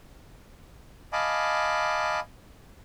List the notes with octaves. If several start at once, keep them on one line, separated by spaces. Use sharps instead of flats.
D#5 F5 G#5 A5 B5 D6